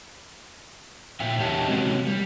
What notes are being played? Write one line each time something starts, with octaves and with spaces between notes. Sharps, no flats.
A#2 E5 G5
E2 G4 C#5 D#5 A5
C3 F#3 G#3 A#3 C#4
G3